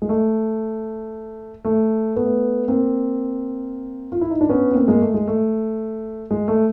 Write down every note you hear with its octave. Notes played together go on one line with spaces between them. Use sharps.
G#3
A3
A3
A3 B3
A#3 C4
F4
E4
D#4
D4
B3 C#4
C#4
A#3 C4
G#3 A#3
A3
G#3
A3
G#3
A3